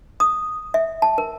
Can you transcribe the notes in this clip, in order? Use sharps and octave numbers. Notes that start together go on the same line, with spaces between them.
D#6
E5
A5
A#4